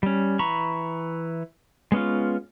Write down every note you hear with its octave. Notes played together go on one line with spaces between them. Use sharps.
G3 C#4
E3 A#5 B5 C#6
G#3 B3 C#4 F4